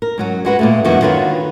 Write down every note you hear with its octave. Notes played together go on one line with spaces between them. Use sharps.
A#4
G#2 F#3 C#4
G#3 F#4 B4
A#2 G#3 A3
F#2 D#3 E3 D#4 F#4
D3 D#3 F4 F#4 B4 C#5